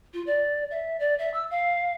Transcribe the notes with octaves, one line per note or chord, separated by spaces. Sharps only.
F4
D5
E5
D5
E5
E6
F5